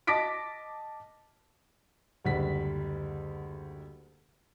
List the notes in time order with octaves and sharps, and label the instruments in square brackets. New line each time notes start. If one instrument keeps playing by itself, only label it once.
[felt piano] D#5 A5 D6 A#6 B6 D7
[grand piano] F#1 D2 G3 F#5 B6